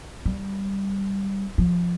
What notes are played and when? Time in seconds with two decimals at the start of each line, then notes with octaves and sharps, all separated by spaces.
0.26 G3
1.58 F3